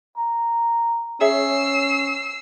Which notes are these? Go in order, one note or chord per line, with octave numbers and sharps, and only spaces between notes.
A#5
C#4 G#4 C#5 E5 E6 C7